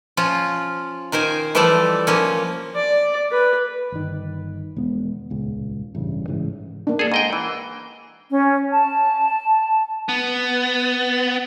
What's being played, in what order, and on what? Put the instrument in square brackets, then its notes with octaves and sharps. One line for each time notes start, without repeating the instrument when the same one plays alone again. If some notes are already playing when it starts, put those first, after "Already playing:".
[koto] F3 C#4 F4
D#3 A#4 C5 G#5
E3 F3 G3 A3 A4 D5
F3 A#3 C#4
[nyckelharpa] D5
B4
[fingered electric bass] G1 D#3
E1 G#3 B3
D#1 C#2
A1 G2 C#3
G#2 C#3 E3
[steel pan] A#3 D4
[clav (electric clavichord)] G#4 A4
G#2 D#5 G5
E3
[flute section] C#4
A5
[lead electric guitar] B3